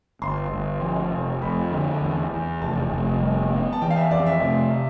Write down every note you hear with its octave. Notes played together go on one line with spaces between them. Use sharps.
G1 C6
G1
F3
F1
F2 B5
D3
E2
E2
F1 A5
F1
G3
B3
A5
E3 G5
F5
E5
F2 D5
E5
C3